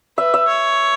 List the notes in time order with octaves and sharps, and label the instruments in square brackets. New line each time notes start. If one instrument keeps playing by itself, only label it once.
[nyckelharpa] B4 [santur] E5
[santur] E5
[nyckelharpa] C#5